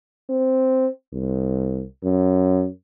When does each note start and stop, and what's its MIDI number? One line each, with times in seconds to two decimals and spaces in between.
0.30 0.88 60
1.13 1.84 36
2.04 2.68 42